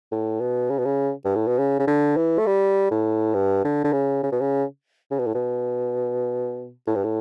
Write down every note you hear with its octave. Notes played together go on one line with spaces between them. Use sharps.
A2
B2
C#3
B2
C#3
G2
A2
B2
C#3
C#3
D3
E3
A3
G3
A2
G2
D3
D3
C#3
C#3
B2
C#3
C#3
B2
A2
B2
A2
G2
A2